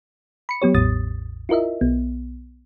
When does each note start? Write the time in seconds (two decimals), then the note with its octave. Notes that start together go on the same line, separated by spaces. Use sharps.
0.49 B5 C#7
0.62 F#3 B3 G4 C#5
0.74 A1 E2 A2 D#6 A6
1.49 E4 F4 A#4 D#5 E5
1.81 B1 B3